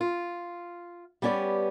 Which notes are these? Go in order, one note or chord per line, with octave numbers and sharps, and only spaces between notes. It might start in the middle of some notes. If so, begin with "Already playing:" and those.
F4
G3 B3 C#4 G4 D5